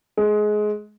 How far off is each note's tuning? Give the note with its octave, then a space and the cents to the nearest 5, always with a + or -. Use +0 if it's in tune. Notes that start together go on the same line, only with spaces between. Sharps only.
G#3 +20